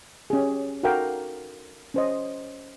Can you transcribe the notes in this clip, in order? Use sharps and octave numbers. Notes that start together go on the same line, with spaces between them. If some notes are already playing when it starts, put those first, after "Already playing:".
C#4 G4 G#4
D#4 F#4 A4 A#4 F5 G5
C#4 C5 D#5